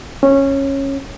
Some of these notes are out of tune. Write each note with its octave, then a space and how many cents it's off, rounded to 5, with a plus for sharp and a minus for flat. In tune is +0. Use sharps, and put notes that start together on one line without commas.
C#4 -15